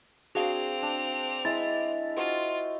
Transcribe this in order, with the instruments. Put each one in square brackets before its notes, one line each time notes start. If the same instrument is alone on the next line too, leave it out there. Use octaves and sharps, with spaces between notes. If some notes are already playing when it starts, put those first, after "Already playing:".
[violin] C4 F7 [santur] D4 [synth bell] F#4 G#4 F5
[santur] D4
[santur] G#3 [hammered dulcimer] E4 [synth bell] A6
[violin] F4 [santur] F#4 C5 D#5